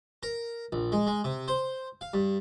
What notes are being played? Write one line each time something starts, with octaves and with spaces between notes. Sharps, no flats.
A#4
A#1
G#3
G#3
C3
C5
F5
G2